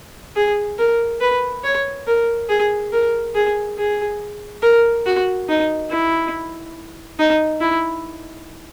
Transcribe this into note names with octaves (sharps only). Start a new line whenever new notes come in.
G#4
A#4
B4
C#5
A#4
G#4
A#4
G#4
G#4
A#4
F#4
D#4
E4
D#4
E4